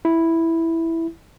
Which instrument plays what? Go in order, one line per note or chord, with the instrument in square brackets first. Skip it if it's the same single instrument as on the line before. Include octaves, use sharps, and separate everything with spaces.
[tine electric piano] E4